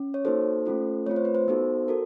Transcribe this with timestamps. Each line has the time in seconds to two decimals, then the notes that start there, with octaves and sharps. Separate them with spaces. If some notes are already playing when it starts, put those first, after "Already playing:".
Already playing: C#4
0.14 C#5
0.25 A#3 D#4 F#4 A4 C5
0.66 A3 C#4 F4 A4
1.06 A3 C4 F4 C#5
1.16 C5
1.25 B4
1.35 C5
1.48 B3 D#4 F#4 A4
1.88 F#4 A4 A#4